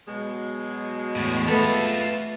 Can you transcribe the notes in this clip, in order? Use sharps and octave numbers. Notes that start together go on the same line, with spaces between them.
B2 F#3 G#3
E2 A2
A3 B3 F4 A4